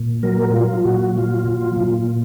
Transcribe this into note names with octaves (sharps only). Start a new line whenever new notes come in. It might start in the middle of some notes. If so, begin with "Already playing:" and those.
Already playing: A#2
F#3 A#4
F#3 F4
A#2 F#4
F#3 F4
A#2
A#2